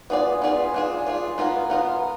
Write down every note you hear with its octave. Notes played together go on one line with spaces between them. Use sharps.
B3 F4 G#4 D5
B3 F4 G#4 D5
D4 F4 G#4
D4 F4 G#4
B3 F4 A#4
B3 F4 A#4